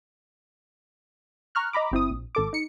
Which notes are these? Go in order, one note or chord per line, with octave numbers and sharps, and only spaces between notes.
A#5 C#6 F6 F#6
D#5 A#5 B5 D6
G1 C4 E4 D#6
A#1
G#1 A4 D6
D#4 C#7